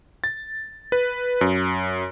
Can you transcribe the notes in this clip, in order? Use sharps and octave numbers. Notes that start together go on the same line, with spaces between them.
A6
B4
F#2